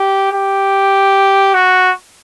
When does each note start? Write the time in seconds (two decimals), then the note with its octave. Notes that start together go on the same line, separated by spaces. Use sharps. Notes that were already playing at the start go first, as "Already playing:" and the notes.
Already playing: G4
0.32 G4
1.54 F#4